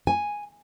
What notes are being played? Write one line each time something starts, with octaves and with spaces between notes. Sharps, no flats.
G#5